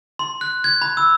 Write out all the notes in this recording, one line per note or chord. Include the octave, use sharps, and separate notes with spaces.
C6
F#6
G#6
B5
E6